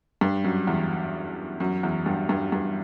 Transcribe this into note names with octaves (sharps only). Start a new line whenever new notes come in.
G2
F#2
E2
F#2
E2
G2
G2
G2